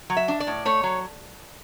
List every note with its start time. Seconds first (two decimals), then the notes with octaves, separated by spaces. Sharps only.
0.10 F#3
0.17 E5
0.28 D4
0.40 D5
0.47 A2
0.65 A3 C#5
0.83 F#3